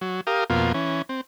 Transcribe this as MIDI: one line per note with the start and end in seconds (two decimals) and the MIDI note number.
0.01 0.21 54
0.27 0.44 67
0.27 0.44 70
0.27 0.44 77
0.27 0.44 87
0.50 0.72 41
0.50 0.72 47
0.50 0.72 58
0.50 0.72 65
0.74 1.02 52
0.74 1.02 61
1.09 1.21 60